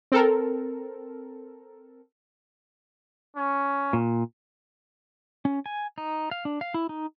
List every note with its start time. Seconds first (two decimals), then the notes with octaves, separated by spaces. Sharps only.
0.12 C4 A4 A#4
3.36 C#4
3.93 A#2
5.45 C#4
5.66 G#5
5.98 D#4
6.31 F5
6.45 D4
6.61 F5
6.74 E4
6.89 D#4